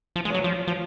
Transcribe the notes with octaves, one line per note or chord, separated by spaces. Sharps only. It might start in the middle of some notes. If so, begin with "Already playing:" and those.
F3
G#3
F#3 C#5
F3
F3